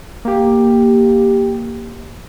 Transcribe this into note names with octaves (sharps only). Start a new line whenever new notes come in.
A#3 G4